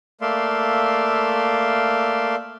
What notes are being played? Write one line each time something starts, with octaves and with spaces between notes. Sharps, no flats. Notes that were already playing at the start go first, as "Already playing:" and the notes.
A3 A#3 D5 E5 F5 C6